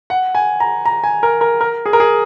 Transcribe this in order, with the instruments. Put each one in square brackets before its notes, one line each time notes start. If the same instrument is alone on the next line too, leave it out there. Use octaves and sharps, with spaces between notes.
[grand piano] F#5
G#5
A#5
A#5
G#5
A#4
A#4
A#4
G#4
A#4
G#4